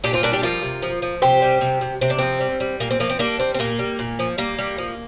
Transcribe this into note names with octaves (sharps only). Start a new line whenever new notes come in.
A#2 D4 G4
C4 F4
G3 A#3 D4
D4 G4
F3 F4 A#4
C3
F3
F3
C3 G4 C5
G3
C3
C3
C3 C4
D4
F3 C4
G3
G3
A#2 A#3
C4
F3 A#3
C4
G3 A#3 D4
G3 C4
C4
A#2 A#3
G3
A#2
F3
G3 A#3
G3
F3